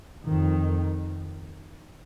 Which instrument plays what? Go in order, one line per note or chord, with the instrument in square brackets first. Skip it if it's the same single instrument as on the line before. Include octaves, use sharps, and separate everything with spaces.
[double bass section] F2 D#3